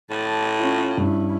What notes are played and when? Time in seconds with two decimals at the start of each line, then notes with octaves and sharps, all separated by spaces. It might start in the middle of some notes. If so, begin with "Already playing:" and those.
0.11 A2 A5
0.59 C#4 F4
0.98 G2 C#4 E4